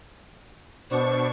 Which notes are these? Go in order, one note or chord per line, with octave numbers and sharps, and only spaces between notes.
B2 D4 C5 C#6